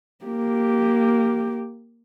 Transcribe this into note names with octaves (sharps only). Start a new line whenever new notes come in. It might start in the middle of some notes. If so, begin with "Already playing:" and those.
A#3 G4